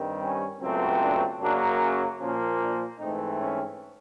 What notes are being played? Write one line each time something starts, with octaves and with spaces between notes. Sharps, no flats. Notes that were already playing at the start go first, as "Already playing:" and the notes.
Already playing: G2 D#3 G3 C4
C#4
C#2 B2 F#3 A3 C4
D4
F#2 C#3 F#3 A#3 D4
A#2 F3 A#3 C#4
D4
G#2 E3 A3 C4 D#4
C#4